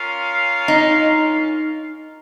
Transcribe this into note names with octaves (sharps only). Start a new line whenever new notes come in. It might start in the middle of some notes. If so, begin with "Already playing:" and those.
Already playing: C#4 F4 A#4 F5
D#4